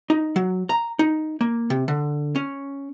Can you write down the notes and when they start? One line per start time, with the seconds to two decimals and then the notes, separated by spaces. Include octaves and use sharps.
0.10 D#4
0.36 F#3
0.69 A#5
0.99 D#4
1.41 A#3
1.70 C3
1.88 D3
2.36 C#4